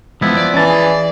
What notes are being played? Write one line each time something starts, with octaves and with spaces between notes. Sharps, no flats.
E2 F3 G#3 B3 E4
D5
E3 C#4 A5
G#4